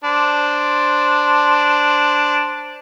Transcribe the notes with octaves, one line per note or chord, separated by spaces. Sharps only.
D4 C5